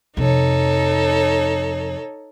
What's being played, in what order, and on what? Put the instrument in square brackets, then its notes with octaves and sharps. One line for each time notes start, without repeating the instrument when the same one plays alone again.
[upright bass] F2 C3 [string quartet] D#4 A4 C#5